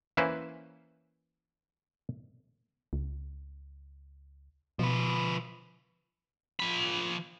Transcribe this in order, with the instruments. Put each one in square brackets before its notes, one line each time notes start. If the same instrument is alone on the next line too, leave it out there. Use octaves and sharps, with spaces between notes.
[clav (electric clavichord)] E3 A#3 C#4 E4 B4 C5
[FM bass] C#2
[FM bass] B2 [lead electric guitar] F3 B4
[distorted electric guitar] F3 B5